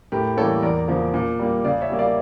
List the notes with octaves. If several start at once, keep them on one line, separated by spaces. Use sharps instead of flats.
A2 G4 A#4
E3 G3 A#3 A4 C#5
E2 A#4 D5
C#3 F3 A#3
A#2
G3 A#3
C#3 D5 F5
C#5 E5
G3 A#3
D5 F5